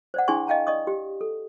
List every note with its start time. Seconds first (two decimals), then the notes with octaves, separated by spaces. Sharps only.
0.14 C5 D5 F#5
0.28 D4 E4 G#4 G#5 C6 C#6
0.47 D#5 F5 G5 A5 A#5
0.67 D5 D#5 C#6 D#6
0.87 G4
1.21 A4